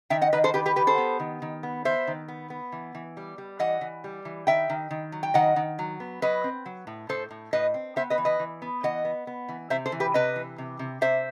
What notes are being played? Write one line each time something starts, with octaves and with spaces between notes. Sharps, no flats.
D#3 E5 G5
D#5 F#5
D#3 B4 D#5
A4 C5
D#3 G4 B4
G4 B4
D#3 G4 B4
A4 C5
B3
D#3
D#3
B3
B3 C5 E5
D#3
B3
B3
E3
E3
G3
G3
E3 D#5 F#5
E3
G3
E3
D#3 E5 G5
D#3
D#3
F#3
G5
D#3 D#5 F#5
D#3
F#3
B3
F#3 B4 D#5
C4
F#3
A2
A2 A4 C5
A2
A2 B4 D#5
C4
B3 C5 E5
B4 D#5
E3
B4 D#5
E3
B3
E3 D#5 F#5
B3
B3
E3
C3 C5 E5
A4 C5
E3
G4 B4
C3 B4 D#5
E3
C3
C3
C3 C5 E5